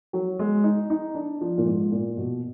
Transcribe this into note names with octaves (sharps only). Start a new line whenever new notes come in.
F#3
G#3
D#4
D#4
D4
F3
A#2
G#2
A#2
B2